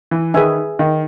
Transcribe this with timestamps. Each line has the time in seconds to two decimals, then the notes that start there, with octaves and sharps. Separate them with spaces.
0.11 E3
0.34 D#3 G#4 B4 E5 G#5
0.79 D#3